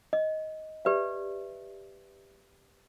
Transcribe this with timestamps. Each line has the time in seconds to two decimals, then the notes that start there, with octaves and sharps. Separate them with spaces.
0.13 D#5
0.85 G4 B4 D5 E5